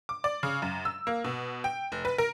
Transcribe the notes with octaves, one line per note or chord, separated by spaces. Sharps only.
D6
D5
C#3
F#2
E6
A#3
B2
G5
F1
B4
A#4